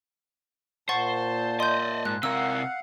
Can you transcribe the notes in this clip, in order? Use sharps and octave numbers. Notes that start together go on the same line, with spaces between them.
A#2 C5 F#5 A5 C#6 A6
D5 D#5 C6 G6
G#2 F#6
C3 A#4 F5 F#5 E6